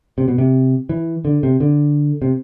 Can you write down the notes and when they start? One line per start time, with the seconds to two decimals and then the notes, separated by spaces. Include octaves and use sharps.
0.18 C3
0.28 B2
0.38 C3
0.89 E3
1.25 D3
1.43 C3
1.60 D3
2.22 C3